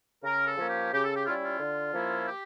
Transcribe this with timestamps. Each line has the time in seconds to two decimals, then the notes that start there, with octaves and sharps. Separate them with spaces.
0.24 C#3 A#4
0.47 A4
0.58 F3 A#3 C#4
0.69 G4
0.92 C#3 G4
1.04 A4
1.14 G4
1.25 G3 C#4 E4 F4
1.45 F4
1.60 D3
1.94 F3 A#3 C#4 E4
2.28 G4